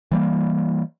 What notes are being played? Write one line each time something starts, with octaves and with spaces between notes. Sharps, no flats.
E3 G3 A#3